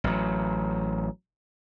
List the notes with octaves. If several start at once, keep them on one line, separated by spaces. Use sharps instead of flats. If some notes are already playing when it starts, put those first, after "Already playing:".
A1 F#3